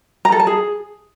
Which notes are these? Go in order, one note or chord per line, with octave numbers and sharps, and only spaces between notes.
A#5
A4
A5
G#4